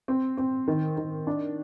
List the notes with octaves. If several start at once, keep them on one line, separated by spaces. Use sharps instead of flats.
C4
C4
D#3
D#3
D4